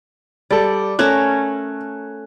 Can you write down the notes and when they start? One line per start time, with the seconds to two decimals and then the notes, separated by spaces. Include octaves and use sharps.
0.51 G3 A4 D5
0.99 A3 C#4 A#4 F#6